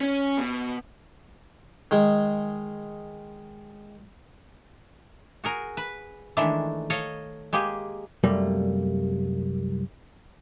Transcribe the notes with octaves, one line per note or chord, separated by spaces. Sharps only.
C#4
B2
D#3 G#3
F#4 G#4 A#4
B4
D#3 E3 G#3 A3 D4 E4
A4 C#5 D#5 F5
G#3 A#3 G4 G#4
C2 F#2 G3 A3 A#3